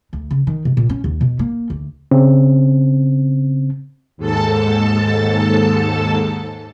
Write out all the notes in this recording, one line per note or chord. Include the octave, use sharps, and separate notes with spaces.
D2
C#3
D#3
B2
A#2
C#4
D#2
B2
A#3
D2
C#3 C4
D#2 G#2 A4 A5